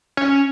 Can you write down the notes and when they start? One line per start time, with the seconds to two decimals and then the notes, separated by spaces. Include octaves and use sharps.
0.17 C#4